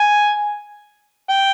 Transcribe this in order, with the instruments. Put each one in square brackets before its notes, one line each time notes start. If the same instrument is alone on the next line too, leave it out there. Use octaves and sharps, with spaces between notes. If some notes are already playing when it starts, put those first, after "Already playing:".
Already playing: [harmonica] G#5
G5